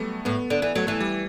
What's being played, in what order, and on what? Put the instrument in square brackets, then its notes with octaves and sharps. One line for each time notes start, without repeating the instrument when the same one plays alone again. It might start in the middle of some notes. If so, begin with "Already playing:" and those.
Already playing: [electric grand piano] F#3 G3 A3 B3
[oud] A2 [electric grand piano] B3
[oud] D3
[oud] E3 [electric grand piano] B3
[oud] F#3 [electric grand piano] A3
[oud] E3 [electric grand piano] A3
[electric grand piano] G3